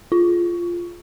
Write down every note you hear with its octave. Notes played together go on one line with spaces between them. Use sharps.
F4